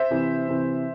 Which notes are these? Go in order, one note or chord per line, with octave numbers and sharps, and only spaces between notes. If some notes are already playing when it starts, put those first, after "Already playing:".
Already playing: C5 E5
C3 E3
C3 E3